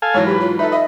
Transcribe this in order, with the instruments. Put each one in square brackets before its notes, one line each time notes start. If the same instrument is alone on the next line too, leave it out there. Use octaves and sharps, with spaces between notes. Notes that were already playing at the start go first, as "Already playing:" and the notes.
[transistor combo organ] A4 F5 G#5
[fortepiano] G#2 E3 F#3 [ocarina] C#5
[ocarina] G4 [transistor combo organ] B4
[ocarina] F4
[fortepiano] D#4 A4 [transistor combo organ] B4 [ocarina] E5
[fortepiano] D#5 [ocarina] E5